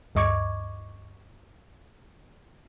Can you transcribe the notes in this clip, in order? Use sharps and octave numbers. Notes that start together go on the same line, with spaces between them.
D2 G2 D#5 C#6 D6 G#6